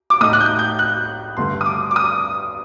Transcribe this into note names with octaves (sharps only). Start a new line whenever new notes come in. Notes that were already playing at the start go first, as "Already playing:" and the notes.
D6
A2 A3 D#4 D#6
F#6
G6
G6
F#6
G2 D3 A3 C6
D#6
D6
D6
D#6